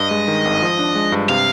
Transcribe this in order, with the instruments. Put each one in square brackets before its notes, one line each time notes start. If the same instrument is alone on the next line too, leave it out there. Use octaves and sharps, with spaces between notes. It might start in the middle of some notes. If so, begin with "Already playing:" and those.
Already playing: [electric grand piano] G2 [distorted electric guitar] D#5
[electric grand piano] G#3
D#3
G#1
F3
D4
G#3
G2
[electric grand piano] C3 [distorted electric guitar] F5